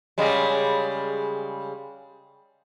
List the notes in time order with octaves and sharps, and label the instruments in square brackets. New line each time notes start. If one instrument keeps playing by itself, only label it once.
[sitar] C#3 G3 G#3